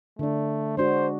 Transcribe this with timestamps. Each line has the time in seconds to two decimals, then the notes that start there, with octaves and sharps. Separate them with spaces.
0.19 D3 A3 D4
0.77 G#3 D4 F#4 C5